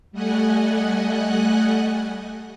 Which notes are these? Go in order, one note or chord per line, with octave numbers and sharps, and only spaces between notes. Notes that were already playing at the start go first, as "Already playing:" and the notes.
G3 A3 D#5 F#5 G#5 F#6